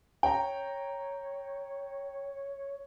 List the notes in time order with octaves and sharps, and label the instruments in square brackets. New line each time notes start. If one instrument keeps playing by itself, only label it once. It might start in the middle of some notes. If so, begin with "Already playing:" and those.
[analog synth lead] C#5 [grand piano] G5 A#5